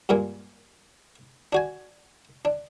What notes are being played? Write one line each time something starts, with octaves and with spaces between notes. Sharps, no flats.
G2 A#2 G#3 A#3
D4 F#4 G#5
D4